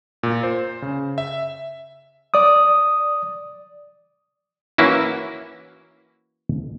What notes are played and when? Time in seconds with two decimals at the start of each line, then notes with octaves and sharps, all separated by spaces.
0.23 A#2
0.43 C5
0.82 C#3
1.18 E5
2.34 D5 D#6
4.78 E3 A#3 C#4 E4 F#4